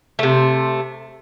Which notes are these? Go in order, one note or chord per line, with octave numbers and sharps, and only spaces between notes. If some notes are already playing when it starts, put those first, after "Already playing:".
C3 A3